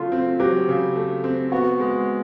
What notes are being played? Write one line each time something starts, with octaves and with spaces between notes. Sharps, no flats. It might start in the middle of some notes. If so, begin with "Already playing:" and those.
Already playing: C#3 F#3 A3 F4
C4
F#3 G4
C#3
A3
C4
B3 F#4
G#3